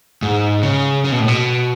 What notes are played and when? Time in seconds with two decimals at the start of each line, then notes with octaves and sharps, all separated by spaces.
0.22 G#2
0.63 C#3
1.04 C#3
1.12 B2
1.20 A2
1.28 B2